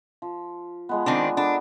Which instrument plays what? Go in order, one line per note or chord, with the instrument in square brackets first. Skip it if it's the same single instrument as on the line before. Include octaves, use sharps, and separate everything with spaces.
[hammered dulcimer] F3
F3 G#3 B3
[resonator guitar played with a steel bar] D#3 C4 D4
[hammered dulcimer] B3 A4 A#4 [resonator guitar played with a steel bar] D4